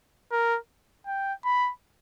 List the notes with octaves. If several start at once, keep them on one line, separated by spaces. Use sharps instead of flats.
A#4
G5
B5